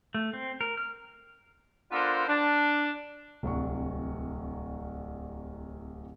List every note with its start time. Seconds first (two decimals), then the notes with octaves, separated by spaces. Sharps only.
0.15 A3
0.33 C4
0.61 A#4
0.77 F6
1.92 B3 D4 F4 A4 A#4 C5
2.28 D4
3.43 D1 C2 C#6